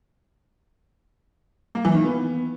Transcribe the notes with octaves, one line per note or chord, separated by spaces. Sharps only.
A#3
E3
D#3
B3